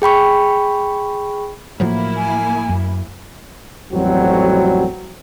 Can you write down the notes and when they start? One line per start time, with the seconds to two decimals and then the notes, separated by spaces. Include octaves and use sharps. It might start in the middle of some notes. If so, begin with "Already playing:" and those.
0.02 G#4 G5 B5 C#6
1.80 A2 F3 F#3 A#3 E4
2.17 G#5
2.69 F#2
3.92 A1 F2 F#3 G3 C4 F#4